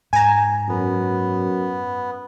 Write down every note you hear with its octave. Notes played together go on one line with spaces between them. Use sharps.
G#2 G#5 A#5
F#2 B3